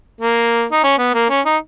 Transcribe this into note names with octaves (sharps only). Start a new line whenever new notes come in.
A#3
D#4
C#4
B3
A#3
C#4
D#4